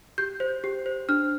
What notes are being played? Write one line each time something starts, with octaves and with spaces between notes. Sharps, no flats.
G4 G6
C5
G4
C5
D4 F6